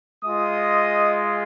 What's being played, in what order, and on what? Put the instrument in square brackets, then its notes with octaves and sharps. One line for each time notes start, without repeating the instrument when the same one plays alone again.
[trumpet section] G#3 F4 D#5 D#6